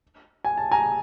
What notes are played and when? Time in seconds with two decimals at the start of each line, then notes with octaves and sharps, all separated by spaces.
0.45 G#5
0.58 A5
0.72 G#5 A#5